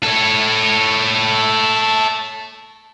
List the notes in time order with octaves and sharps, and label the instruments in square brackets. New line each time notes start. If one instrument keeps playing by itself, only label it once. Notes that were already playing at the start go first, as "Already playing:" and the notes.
[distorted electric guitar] A4 C#5